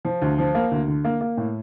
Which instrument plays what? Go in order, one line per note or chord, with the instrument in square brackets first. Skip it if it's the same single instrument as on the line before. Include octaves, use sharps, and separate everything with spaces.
[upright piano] F3
D2
F3
A#3
D2
D3
A#3
A#3
A2